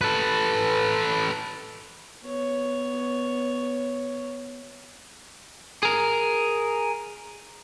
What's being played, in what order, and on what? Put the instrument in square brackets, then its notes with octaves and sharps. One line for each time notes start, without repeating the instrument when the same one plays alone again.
[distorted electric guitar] A4 B4
[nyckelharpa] B3 C#5
[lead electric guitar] G#4 A#4